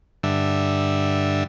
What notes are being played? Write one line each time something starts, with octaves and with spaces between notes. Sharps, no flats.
G2 D3 E5